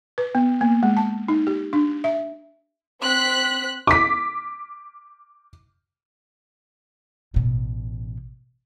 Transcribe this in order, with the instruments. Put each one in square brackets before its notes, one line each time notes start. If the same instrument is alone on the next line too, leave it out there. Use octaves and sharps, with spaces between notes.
[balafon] B4
B3
A#3
G#3
A5
D#4
G4
D4
E5
[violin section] C4 F#6 B6
[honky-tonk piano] D6 B6
[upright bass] A1 B2